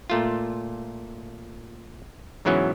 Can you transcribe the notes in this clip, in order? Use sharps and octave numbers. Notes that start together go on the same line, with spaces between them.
A#2 A3 F4
G#2 C#3 E3 F#3 B3 C#4